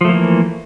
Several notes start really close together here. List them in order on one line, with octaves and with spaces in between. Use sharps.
F3 A3 A#3 E3